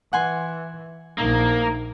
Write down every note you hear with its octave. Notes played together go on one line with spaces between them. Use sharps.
E3 F#5 G#5 C6
A#1 A#3 D#4